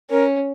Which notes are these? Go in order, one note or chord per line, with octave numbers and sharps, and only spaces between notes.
C#4 A#4